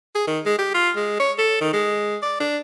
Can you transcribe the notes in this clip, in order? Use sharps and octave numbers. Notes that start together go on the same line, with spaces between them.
G#4
D#3
G#3
G4
F4
G#3
C#5
A4
D#3
G#3
D5
D4